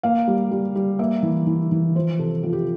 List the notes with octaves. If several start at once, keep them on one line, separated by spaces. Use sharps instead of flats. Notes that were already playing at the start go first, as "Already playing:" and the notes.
A#3 F5
G3
G3
G3
A#3 E5
E3
E3
E3
F3 C5
C3 A4
F3 F4
G4